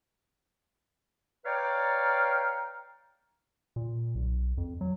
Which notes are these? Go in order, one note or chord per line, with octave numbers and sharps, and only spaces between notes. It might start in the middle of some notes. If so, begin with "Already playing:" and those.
B4 C#5 D5 F5 G5 A#5
A#2
B1
F2
F#3